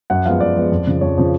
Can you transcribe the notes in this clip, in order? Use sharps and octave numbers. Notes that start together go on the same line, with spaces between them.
F#2 F#5
F3 G#3 B3 F5
F#2 D5
F3 G#3 B3
F2
C#3 F3
F2 C#5
C#3 F3